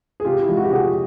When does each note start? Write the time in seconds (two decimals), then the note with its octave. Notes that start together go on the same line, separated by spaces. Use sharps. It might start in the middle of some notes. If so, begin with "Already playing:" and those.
0.20 G#4
0.25 C3 F4 G4
0.42 E4
0.48 F3 G#3 F4
0.57 F#4
0.64 G4
0.71 C3 F#4 G#4